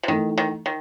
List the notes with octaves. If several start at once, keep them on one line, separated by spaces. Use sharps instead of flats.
C3
D#3 E3 A3 D#4
D#3
D#3